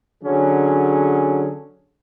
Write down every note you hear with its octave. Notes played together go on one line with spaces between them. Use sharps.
D3 F#3 C#4 G#4